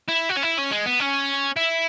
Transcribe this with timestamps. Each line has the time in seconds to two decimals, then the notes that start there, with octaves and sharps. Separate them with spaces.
0.09 E4
0.30 F#4
0.37 C#4
0.43 E4
0.59 C#4
0.71 G#3
0.86 B3
1.00 C#4
1.56 E4